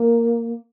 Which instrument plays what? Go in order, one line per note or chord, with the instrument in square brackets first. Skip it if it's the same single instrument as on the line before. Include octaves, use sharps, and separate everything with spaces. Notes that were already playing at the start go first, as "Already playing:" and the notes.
Already playing: [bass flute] A#3